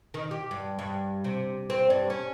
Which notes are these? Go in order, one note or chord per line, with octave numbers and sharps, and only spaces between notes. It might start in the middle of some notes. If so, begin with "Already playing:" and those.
D#3
G4
G2
G2
C3
C4
G2
C#4